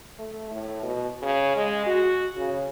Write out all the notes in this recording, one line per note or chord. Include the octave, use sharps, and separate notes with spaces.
A3
A2
B2
C#3
G#3
F#4
C#3